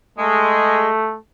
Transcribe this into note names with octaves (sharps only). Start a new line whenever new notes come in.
G#3 A3